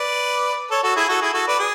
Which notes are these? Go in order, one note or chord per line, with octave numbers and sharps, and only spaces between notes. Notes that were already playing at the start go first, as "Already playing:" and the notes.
Already playing: B4 D5
A4 C#5
F#4 A4
E4 G#4
F#4 A4
E4 G#4
F#4 A4
B4 D5
G#4